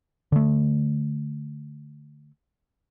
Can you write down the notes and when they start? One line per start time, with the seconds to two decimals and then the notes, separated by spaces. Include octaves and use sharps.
0.32 D3 A3